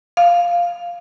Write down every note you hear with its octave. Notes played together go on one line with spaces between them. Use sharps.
F5